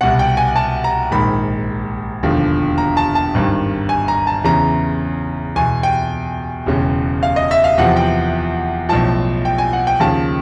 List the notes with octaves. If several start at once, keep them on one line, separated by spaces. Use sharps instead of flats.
C2 B2 F#5
G5
G#5
A5
A#5
A#1 G#2 D#3 B5
E1 D#2 D3 F3
A#5
A5
A5
G#1 G2 D#3
G#5
A#5
A5
E2 C#3 E3 A#5
E2 B2 G#5
G5
E1 E2 C#3
F5
D#5
E5
F5
E2 C3 F3 F#5
G5
B1 A2 F3 A5
G5
G#5
F#5
G5
D#2 C#3 F3 A5